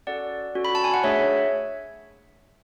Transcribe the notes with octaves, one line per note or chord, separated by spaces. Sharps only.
C#4 F#4 A4 D5 F#5
C#4 F#4 A4
B5
A5
G#5
F#5
A3 D4 G#4 C#5 E5